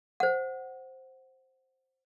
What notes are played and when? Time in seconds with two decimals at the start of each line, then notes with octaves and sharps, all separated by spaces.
0.20 C5 F#5